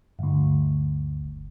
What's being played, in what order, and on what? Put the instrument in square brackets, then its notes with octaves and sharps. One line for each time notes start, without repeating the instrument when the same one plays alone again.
[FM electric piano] G1 D2